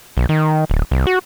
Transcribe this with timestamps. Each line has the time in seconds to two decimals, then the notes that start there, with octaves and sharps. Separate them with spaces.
0.17 B1
0.29 D#3
0.70 D1
0.91 C2
1.07 F#4